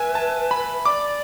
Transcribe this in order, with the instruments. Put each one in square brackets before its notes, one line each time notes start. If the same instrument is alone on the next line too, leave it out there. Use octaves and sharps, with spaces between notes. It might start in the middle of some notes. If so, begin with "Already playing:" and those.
Already playing: [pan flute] B4 [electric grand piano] E5 G#5
[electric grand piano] A5
B5
[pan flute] D5 [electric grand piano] D6